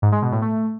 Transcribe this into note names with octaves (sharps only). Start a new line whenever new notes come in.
G#2
G#3
B2
A2
A3